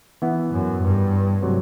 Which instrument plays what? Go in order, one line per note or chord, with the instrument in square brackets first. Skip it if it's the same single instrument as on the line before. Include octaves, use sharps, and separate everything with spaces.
[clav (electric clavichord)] E3 B3 E4
[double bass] F#2
G2
[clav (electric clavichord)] C3 F#3 A3